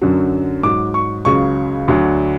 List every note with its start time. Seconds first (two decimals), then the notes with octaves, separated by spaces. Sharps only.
0.02 F#2 D3 F#3
0.63 G#2 F#3 D6
0.94 C#6
1.25 C#2 C#3 F#3 C#6
1.88 D2 D3 F#3